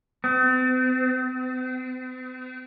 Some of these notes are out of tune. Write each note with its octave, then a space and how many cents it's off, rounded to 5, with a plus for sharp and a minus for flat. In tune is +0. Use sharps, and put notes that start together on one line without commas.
C4 -45